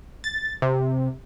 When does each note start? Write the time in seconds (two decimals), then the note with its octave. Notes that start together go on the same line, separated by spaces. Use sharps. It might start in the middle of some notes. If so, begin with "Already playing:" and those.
0.24 A6
0.62 C3